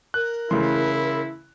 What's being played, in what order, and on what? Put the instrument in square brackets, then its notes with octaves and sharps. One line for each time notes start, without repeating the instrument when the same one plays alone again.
[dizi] A#4 [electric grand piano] F#6
[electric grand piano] C#3 C6 [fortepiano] E3 A3 [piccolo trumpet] E4